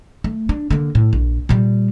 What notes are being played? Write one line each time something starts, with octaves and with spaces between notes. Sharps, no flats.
A3
D4
D3 A#3
A2
A#1
A#2 G3